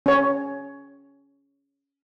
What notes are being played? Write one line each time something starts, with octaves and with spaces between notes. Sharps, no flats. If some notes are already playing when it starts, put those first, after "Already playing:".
C#4 C#5